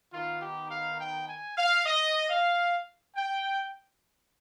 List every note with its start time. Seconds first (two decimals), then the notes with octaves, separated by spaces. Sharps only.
0.12 D#3 B3 D#4 F4
0.41 G4
0.71 F5
0.99 G5
1.28 G#5
1.57 F5
1.86 D#5
2.29 F5
3.16 G5